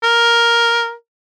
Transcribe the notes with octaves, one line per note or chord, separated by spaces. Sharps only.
A#4